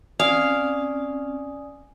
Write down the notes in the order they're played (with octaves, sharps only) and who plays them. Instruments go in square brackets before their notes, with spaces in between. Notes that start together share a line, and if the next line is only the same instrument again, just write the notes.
[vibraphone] C4 C#4 [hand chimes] D5 G#5 D#6 [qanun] F5